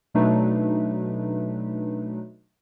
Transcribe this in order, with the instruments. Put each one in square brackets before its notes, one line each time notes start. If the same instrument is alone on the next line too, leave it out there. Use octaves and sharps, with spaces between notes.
[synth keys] B2 F#3 A3 D4 D#4 B4